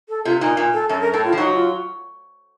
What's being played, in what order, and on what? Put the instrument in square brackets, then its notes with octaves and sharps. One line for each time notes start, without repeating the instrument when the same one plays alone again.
[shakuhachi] A4
[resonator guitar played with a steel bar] C3 [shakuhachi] F4
[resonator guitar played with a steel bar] A#2 [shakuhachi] D#4
[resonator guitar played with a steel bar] A#2
[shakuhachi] A4
[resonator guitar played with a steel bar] F#2 [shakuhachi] A4
[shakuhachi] A#4
[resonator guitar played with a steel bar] A2 [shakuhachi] A4
[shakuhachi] F4
[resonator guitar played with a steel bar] F3
[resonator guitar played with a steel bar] F#3 [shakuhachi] D#4
[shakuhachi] F4